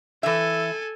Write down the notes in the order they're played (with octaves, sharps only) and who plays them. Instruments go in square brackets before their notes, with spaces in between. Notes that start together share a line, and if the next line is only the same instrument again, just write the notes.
[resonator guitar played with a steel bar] E3 E5 [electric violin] A4 G#5